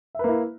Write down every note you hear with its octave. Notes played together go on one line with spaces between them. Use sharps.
A#3 E4 B4 E5